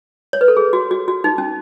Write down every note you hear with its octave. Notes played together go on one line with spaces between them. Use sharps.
C#5
B4
A4
G#4
F#4
F#4
F#4
D#4
C#4